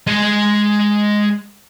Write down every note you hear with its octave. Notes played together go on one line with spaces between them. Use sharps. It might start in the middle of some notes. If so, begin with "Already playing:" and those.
G#3 G#5